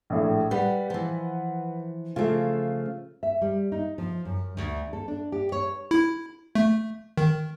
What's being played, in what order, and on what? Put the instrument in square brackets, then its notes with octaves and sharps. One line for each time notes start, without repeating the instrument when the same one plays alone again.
[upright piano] A#1 A2
[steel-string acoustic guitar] G3 [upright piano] B4 F#5
[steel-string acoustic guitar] E3 F3
[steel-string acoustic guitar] C#3 F3 A3 [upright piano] F4
[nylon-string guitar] E5
G3
D#4
F3
F#2
D2
A4
D4
G4
C#5
[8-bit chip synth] E4
A3
D#3